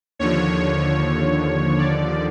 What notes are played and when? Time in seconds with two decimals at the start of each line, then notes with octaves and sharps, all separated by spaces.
0.19 D#2 D3 F3 C#5
1.78 D5